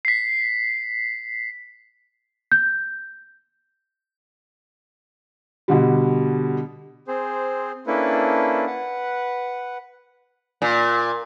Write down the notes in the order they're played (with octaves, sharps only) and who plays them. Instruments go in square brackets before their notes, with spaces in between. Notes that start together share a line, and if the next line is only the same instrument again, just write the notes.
[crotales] B6 C7
[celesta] G6
[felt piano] B2 D3 G3
[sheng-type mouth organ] C4 G#4 C5
A#3 C#4 D4 E4 A4 B4
B4 F#5
[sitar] A#2